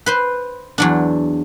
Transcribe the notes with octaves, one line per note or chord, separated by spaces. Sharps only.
B4 C5 C6
E2 F#3 D4